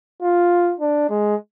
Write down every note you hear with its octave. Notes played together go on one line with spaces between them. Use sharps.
F4
D4
G#3